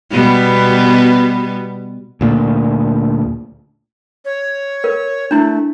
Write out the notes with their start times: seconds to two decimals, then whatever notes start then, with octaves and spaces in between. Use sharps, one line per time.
0.11 B2 G3 B3
2.21 D2 A#2
4.25 C#5
4.84 A#4
5.31 A3 D4 E4